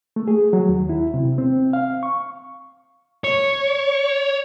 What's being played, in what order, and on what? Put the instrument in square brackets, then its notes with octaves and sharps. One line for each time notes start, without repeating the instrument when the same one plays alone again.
[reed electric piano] A3
G#4
F#3
D#2
E4
C3
C4
F5
C#6
[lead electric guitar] C#5